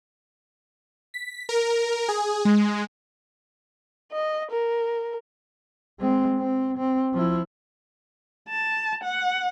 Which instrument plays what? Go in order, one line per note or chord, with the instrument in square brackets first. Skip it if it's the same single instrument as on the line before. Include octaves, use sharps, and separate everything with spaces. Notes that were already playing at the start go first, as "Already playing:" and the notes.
[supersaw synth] B6
A#4
G#4
G#3
[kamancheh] D#5
A#4
[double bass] G#3 C4
C4
C4
F3 E4
[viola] A5
F#5